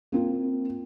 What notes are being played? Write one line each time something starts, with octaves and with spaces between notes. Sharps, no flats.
A#3 C4 F4